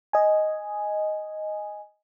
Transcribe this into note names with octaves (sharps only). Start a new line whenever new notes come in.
D#5 G#5